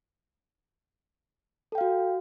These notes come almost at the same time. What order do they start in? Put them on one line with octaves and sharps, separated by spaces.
A4 G5 F5 F#4